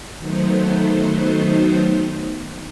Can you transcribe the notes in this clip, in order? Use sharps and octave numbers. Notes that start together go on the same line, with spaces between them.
D#3 F#3 A3 B3 D#4 C5